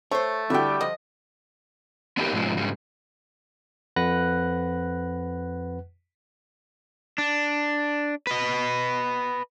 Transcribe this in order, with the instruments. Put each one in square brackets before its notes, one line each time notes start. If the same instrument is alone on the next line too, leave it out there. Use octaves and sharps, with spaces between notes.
[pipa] A3 [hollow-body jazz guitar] C5 C#5
[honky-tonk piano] D3 F#4 G5 [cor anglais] G3 [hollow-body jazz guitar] E4 E5
[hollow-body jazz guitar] F3 [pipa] D#5
[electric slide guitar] B3 D4 D#4 F4 G4 A#4
G#2 B2 F3 F#3 G#3
G#2 C#3 G3
[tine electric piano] F2 B4 F#5 F#6 A#6
[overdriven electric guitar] D4
B4 D#5